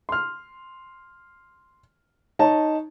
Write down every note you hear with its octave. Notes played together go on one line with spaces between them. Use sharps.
C6 F6
D#4 C#5 A5